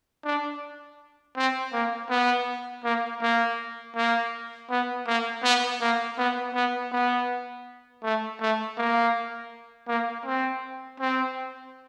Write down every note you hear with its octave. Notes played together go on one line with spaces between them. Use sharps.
D4
C4
A#3
B3
A#3
A#3
A#3
B3
A#3
B3
A#3
B3
B3
B3
A3
A3
A#3
A#3
C4
C4